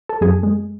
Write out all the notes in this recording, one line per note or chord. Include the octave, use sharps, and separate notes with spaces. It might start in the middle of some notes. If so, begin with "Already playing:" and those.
A4
F#2 G#4
G#3